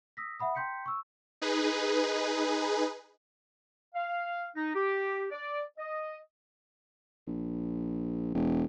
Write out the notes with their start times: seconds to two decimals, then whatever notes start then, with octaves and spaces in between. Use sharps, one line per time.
0.17 D#6 E6 A#6 B6
0.40 E5 F#5 B5 D#6
0.55 G5 A#5 C6 G6 B6 C#7
0.86 C#6 E6
1.42 D#4 G#4 B4
3.95 F5
4.56 D#4
4.75 G4
5.32 D5
5.78 D#5
7.27 A#1
8.34 E1